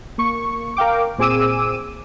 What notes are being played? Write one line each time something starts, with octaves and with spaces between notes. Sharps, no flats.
A#3 C#6
A#4 F5 G5 D6
A#2 C4 G#4 D6 E6 D#7